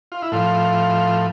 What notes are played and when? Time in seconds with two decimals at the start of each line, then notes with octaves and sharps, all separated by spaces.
0.12 F4
0.22 E4
0.32 A2 F3 F4